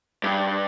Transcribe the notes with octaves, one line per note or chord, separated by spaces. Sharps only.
G2